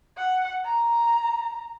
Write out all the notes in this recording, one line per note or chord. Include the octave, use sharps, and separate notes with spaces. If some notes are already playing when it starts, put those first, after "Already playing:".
F#5
A#5